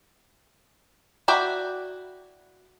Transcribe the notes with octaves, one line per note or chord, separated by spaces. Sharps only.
E4 F#4 D5 E5 G5